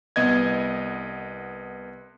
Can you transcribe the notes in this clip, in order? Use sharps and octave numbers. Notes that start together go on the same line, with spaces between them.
C2 B3 D#5 G#6